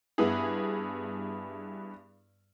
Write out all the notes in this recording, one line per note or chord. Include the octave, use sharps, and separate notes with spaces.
G2 B3 E4 G#4